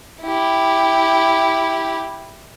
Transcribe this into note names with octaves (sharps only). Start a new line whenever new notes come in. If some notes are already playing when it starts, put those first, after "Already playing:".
E4 G4